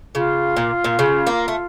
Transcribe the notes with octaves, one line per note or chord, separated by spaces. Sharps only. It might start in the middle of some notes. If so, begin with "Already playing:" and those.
C#3 F4
A#2
A#2
C#3
A#3
A3